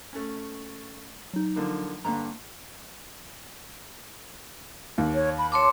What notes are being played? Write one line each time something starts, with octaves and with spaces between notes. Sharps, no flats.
A3 C#4
F#3 D#4
D3 F3 A#3
G2 D3 A#3 A#5
D#2
C#5
B5
C#5 A5 C6 D6